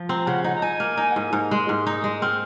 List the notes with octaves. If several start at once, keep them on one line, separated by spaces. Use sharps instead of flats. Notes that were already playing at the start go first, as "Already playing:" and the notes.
Already playing: F3
C4 A#5
C#3 F#5
D#4 F#5
A#5
D#4 G#5
A#3
D#4
F#5
G#2 G#5
G#2 A#5
G#3 C6
G#2
D#4 D#6
G#3
C4 F6